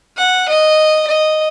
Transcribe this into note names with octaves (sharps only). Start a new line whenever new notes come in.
F#5
D#5
D#5